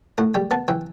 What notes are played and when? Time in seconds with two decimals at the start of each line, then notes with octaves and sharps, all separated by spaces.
0.18 A2 F#5
0.34 G3 G5
0.51 B3 A5
0.68 E3 G5